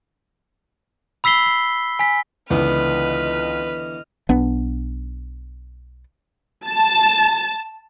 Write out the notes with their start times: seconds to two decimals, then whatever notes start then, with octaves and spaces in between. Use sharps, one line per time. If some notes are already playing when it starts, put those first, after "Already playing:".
1.24 B5 E6 B6 C7 G7
1.46 C7
1.99 G#5 B6
2.50 C#2 D3 E3 B3 B4 D#5 F6
4.29 B1 B3 D4
6.67 A5